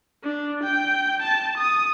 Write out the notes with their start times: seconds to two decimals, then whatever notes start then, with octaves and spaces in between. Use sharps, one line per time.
0.24 D4
0.64 G5
1.22 A5
1.58 D#6